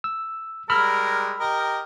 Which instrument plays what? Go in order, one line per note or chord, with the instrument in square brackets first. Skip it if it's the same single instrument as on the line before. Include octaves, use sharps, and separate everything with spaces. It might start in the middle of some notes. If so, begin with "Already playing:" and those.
[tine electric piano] E6
[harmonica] G3 G#3 A#4 [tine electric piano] B5 E6 F6
[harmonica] G4 A#4 D#5